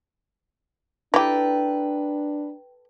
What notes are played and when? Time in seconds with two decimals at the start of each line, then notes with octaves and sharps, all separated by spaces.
1.14 D4 E4 G4 A4 B4 G5 A#5